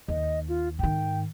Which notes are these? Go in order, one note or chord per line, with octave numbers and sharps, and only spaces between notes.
D#2 D#5
F4
G#2 D#3 G5